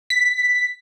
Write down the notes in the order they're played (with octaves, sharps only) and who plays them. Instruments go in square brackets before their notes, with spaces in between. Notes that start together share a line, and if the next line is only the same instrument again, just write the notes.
[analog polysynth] B6